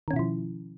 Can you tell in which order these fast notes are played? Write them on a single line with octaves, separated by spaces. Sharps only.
D#3 C#4 B2 E4 F3